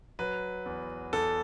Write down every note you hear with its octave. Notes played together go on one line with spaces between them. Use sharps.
F#3 B4
E2
E2 A4